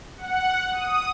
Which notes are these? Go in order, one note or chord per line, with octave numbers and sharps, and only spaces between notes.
F#5
D#6